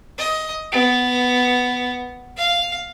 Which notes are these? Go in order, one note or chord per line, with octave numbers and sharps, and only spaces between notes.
D#5
B3
F5